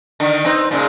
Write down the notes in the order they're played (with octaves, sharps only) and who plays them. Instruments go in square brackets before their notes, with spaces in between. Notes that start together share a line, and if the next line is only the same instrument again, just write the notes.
[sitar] D3 D#3
C4 D#4 B4
A#2 C#3 G#3